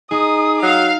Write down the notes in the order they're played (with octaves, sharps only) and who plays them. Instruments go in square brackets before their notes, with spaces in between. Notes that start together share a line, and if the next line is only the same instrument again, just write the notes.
[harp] D#4 [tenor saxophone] G#4 [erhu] D#6
[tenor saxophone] F#3 [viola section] F5